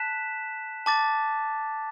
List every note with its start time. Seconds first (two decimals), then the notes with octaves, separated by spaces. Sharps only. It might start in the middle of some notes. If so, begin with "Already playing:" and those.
Already playing: A5 F#6 B6 E7
0.86 A5 D6 A6